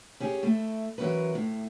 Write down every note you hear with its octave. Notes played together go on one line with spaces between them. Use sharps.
C#4 G4 G#4
A3 E4
E3 F#3 C#4 A#4 B4
A2